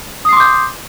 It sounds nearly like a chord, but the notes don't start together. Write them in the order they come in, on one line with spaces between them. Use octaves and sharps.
D#6 C7 C6 D6 G6